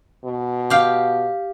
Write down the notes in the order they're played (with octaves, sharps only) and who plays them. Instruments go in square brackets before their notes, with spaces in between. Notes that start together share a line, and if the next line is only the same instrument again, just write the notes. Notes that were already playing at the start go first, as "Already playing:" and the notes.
[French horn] B2
[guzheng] G4 F5